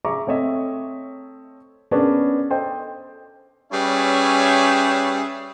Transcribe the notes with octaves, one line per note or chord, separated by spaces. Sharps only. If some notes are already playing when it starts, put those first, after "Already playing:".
G#4 E5 A#5 C#6 D6
A3 C4 C#5 D#5 E5
B3 C#4 D4 G#4 A#4 B4
A4 C5 D#5 G5
G3 C#4 G#4 B4 C#5 E5